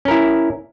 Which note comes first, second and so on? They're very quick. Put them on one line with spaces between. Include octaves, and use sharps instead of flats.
C#4 A#4 E4